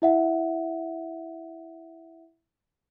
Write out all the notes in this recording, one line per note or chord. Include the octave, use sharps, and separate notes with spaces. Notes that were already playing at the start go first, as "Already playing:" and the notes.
E4 E5 F#5